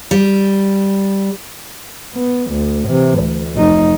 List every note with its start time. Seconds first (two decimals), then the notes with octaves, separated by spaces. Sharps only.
0.11 G3
2.14 B3
2.51 D2
2.87 C3 E3
3.19 D2
3.56 F1 D#4